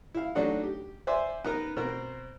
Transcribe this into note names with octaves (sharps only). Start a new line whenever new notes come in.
E4 F5
F#3 A3 D4 D#4 F#4 F#5
G4
C5 D5 E5 G#5 C6
B3 D#4 A#4
B2 C4 A#4 C5